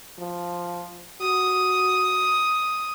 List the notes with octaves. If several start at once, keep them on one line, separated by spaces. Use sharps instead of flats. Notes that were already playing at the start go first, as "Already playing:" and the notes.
F3
F#4 D#6